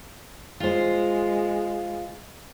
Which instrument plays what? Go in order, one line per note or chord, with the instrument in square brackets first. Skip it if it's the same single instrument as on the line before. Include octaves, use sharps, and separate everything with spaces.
[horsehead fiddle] G#3 [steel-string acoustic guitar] F4 C5